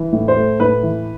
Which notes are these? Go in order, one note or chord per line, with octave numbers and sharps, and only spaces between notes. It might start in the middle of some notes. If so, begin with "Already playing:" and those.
Already playing: E3
A2
C5
A3
A2 B4
E3